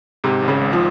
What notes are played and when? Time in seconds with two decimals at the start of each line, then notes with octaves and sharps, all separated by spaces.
0.24 G#2 C3
0.42 G#1
0.48 C#3
0.61 G#1
0.73 F3